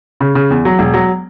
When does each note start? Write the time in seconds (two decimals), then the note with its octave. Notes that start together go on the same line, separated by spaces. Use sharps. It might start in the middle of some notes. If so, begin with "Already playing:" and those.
0.20 C#3
0.35 C#3
0.50 E2
0.65 F#3
0.79 E1
0.94 F#3